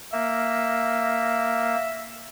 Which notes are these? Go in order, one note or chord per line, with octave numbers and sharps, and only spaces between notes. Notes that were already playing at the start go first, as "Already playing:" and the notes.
A#3 E5